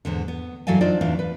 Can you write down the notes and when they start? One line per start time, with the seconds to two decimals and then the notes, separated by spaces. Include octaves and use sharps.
0.05 E2 G#2 D3
0.28 B3
0.67 G2 E3 F#3 A4 F5 G#5
0.81 D4 D#4 F4 C5 D5
1.01 E2 A2 E3 D4 F5
1.19 B4